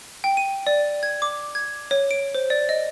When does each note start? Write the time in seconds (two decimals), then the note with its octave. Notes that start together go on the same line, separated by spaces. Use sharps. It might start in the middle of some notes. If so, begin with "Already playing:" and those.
0.24 G5
0.37 D#7
0.67 D5
1.03 G#6
1.22 D6
1.55 G#6
1.91 C#5
2.11 D7
2.35 C5
2.50 D5
2.69 D#5